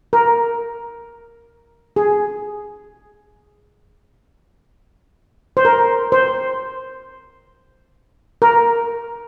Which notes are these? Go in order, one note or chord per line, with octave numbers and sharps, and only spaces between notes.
A#4
G#4
C5
A#4
C5
A#4